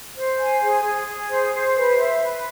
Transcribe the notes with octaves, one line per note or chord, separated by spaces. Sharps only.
C5
G#5
G#4
G#4
G#4
C5
C5
B4
E5
B4